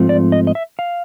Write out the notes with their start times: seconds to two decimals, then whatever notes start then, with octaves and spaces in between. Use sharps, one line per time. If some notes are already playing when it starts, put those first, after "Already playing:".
Already playing: G#2 F3 A3 C4 F4
0.09 D5
0.32 D#5
0.47 D#5
0.55 E5
0.79 F5